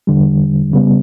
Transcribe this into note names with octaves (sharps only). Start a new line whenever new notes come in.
E2 D3 G3
C#3 G3 B3